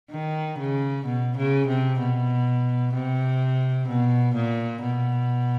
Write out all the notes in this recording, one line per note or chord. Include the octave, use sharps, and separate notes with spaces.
D#3
C#3
B2
C#3
C3
B2
C3
B2
A#2
B2